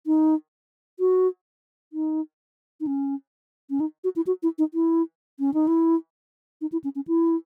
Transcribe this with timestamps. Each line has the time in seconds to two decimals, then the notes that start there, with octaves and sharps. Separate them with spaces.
0.07 D#4
1.00 F#4
1.93 D#4
2.80 D#4
2.87 C#4
3.70 C#4
3.80 D#4
4.04 F#4
4.16 E4
4.27 F#4
4.43 E4
4.58 D#4
4.74 E4
5.40 C#4
5.54 D#4
5.67 E4
6.61 D#4
6.72 E4
6.84 C#4
6.95 C#4
7.07 E4